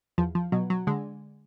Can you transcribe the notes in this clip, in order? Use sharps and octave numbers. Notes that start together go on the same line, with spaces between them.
E2 F3
F3
B2 F#3
F#3
D3 G#3